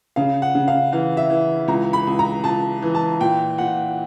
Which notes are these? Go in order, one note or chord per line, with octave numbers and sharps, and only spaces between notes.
C#3 F5
F#5
C#3
F5
E3 F5
E5
E3
C#2 A#5
B5
C#2
A#5
C#2 A5
E3
A5
A#2 G5
A#2 F#5